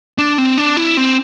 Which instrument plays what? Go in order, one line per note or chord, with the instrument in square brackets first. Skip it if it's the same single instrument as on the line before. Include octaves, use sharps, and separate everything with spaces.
[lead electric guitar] D4
C4
D4
E4
C4